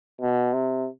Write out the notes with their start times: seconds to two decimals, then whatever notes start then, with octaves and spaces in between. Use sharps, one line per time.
0.21 B2
0.53 C3